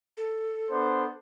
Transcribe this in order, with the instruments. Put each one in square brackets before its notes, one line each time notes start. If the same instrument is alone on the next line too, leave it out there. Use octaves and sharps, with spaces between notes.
[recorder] A4
[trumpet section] B3 D4 C5